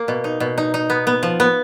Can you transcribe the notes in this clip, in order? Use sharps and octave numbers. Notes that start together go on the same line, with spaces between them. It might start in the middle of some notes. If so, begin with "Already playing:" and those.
Already playing: A#3
B2
D#4
B2
D#4
D#4
B3
B3
F3
B3